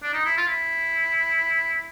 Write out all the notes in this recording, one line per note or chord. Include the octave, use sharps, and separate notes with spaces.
D4
D#4
E4
F4
E4